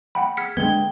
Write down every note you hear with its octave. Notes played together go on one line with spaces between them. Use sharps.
F#5 G5 B5
G#4 F6 B6 C#7
D3 G#3 B3 G5 G#6